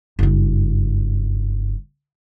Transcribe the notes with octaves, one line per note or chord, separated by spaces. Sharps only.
F#1 G2